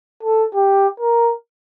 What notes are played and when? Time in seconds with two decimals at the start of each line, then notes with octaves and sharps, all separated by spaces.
0.23 A4
0.55 G4
1.00 A#4